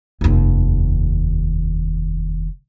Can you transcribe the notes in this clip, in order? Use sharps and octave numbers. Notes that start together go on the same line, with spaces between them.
F1 D#2